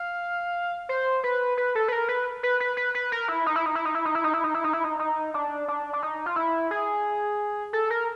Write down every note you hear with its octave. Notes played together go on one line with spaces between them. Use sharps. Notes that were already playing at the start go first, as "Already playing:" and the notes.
Already playing: F5
C5
B4
B4
A4
B4
A#4
B4
B4
B4
B4
B4
A#4
E4
D#4
E4
D#4
E4
D#4
E4
D#4
E4
D#4
E4
D#4
E4
D#4
E4
D#4
D#4
D4
D4
D4
D#4
F4
E4
G#4
A4
A#4